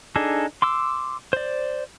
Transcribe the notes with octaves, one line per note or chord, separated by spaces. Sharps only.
D4 D#4 G#4 A4
C6 D6 E6
C5 D5